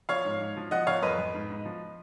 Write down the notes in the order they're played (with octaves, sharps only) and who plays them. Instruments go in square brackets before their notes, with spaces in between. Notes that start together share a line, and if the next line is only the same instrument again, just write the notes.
[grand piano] F3 C#5 F5
G#2
G#2
F3
F3 D#5 F#5
F3 C#5 F5
F2 B4 D#5
F2
G#2
G#2
F3